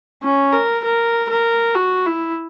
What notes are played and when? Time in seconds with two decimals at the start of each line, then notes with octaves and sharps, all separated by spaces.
0.23 C#4
0.53 A#4
0.84 A#4
1.30 A#4
1.75 F#4
2.06 E4